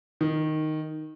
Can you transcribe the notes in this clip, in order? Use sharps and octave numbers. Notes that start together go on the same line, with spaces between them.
D#3